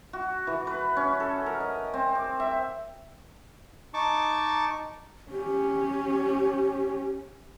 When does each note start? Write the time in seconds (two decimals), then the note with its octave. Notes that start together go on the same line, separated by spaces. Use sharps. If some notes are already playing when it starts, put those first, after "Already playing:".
0.13 F#4
0.47 E3
0.67 B4
0.96 C#4
1.20 A4
1.46 A#4
1.60 D#5
1.94 C4
2.15 D6
2.40 E5
3.94 D#4 A5 C#6 D6
5.32 C#4 G4